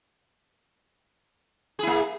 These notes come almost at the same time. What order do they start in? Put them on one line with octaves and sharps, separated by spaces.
G#4 E4 A#3